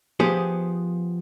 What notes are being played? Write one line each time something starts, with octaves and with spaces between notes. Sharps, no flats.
F3 B3 G4 G#4 C5